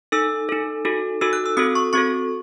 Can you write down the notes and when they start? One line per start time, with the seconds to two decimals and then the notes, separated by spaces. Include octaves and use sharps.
0.12 D#4 A4 E6
0.49 D#4 A4
0.85 D#4 F#4 A4
1.21 D#4 F#4 A4 E6
1.33 F#6
1.46 E6
1.57 C4 F#4 A4 D#6
1.75 C#6
1.93 C4 F#4 A4 C#6